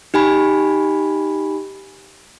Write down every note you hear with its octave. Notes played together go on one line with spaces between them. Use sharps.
D#4 G4 G#5 B5